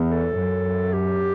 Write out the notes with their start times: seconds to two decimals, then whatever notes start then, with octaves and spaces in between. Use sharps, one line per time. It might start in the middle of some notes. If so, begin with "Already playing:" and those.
Already playing: E2
0.11 A4
0.38 F#2
0.93 G4